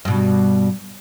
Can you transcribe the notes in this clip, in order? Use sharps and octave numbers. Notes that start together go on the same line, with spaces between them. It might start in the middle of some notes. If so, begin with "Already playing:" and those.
G2 B2